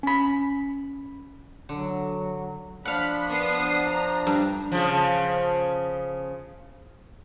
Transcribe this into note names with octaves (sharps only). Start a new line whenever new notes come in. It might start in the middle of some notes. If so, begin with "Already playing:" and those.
C#4 B5
D3 F#3
F3 D4 F5 F#5 B5
B3 D#6 C7
A#5
G2
C#3 F3